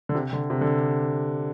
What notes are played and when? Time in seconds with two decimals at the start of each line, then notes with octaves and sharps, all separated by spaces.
0.09 D3
0.15 C3
0.33 D3
0.50 C3
0.61 D3